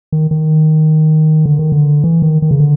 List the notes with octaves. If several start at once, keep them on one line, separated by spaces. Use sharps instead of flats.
D#3
D#3
D3
D#3
D3
E3
D#3
D#3
C#3
D3